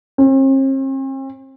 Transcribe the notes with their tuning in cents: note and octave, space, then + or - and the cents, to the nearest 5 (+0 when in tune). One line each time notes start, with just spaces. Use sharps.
C4 +45